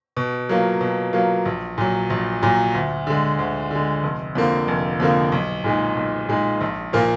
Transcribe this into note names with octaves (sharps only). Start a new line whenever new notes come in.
B2
F#3 A#3 F4
B2
F#3 A#3 F4
A#1
A#2 F#3
A#1
A#2 F#3
D2
D3 G#3
D2
D3 G#3
F1
F2 D3 F3 A#3
F1
F2 D3 F3 A#3
B1
A#2 G#3 D#4 G#4
B1
A#2 G#3 D#4 G#4
A#1
A#2 F3 A#3 F4